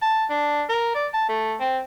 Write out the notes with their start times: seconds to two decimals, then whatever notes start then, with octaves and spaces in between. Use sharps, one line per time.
0.02 A5
0.30 D4
0.69 A#4
0.95 D5
1.14 A5
1.29 A3
1.60 C4